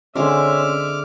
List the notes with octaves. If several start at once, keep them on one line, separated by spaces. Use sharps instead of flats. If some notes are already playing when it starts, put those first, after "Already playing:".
D3 G#3 C4 C#4 E5 D6 F6